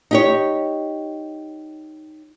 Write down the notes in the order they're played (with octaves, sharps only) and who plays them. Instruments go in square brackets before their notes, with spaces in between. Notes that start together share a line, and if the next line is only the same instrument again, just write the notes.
[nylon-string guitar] D#4 G4 C#5